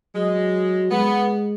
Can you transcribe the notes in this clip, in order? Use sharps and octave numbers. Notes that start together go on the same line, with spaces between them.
F#3 G#3
G#3 B3